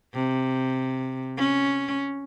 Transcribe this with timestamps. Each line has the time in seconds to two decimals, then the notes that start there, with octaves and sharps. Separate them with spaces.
0.14 C3
1.37 C#4